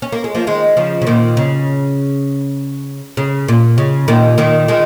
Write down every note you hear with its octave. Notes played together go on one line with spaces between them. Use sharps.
C#4
A#3
G#3
F3 A#3
D#3 G#3
C#3 F3
C#3
A#2 D#3
C#3
C#3
A#2
C#3
A#2 D#3
A#2 D#3
D#3 G#3